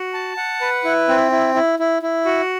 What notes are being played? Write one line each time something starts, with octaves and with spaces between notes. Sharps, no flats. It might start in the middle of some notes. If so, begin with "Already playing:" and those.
Already playing: F#4
A5
F#5
B4
E4
C4
E4
E4
E4
E4
F#4